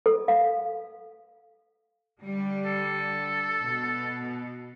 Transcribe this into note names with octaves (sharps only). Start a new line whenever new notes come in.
A4
F5
D3 G3
A4
B2